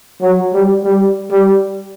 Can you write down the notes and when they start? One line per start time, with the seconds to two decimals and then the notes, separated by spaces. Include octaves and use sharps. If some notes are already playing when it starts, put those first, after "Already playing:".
0.22 F#3
0.53 G3
0.84 G3
1.31 G3